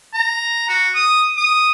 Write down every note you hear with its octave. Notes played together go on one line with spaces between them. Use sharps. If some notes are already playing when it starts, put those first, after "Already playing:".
A#5
F#4
D#6
D#6